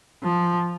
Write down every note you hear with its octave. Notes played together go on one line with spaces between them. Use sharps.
F3